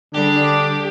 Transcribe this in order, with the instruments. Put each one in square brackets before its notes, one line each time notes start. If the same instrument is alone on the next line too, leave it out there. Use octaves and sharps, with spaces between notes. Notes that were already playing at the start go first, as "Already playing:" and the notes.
[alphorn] D3 [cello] G3 G#4 [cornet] D4 [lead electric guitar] G4